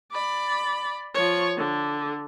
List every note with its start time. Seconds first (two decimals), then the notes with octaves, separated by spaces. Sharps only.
0.12 D5 B5
1.14 F3 C#5
1.57 D3